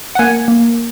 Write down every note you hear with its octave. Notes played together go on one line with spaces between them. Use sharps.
F#5
A#3 G#5
A#3